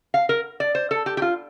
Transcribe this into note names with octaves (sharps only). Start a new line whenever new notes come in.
F5
A#4
D5
C5
A4
G4
G4
F4